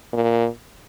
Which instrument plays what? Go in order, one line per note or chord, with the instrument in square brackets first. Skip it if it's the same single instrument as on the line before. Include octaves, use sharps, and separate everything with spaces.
[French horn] A#2